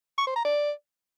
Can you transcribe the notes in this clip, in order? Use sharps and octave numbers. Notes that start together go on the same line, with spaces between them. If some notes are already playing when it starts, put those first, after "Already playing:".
C#6
C5
A#5
D5